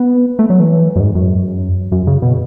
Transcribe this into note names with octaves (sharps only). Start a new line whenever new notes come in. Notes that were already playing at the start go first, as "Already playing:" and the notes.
Already playing: B3
A3
F#3
E3
F#2
G#2
F#2
F#2
C#3
B2